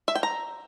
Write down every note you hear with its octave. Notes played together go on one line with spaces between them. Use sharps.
E5
G5
A#5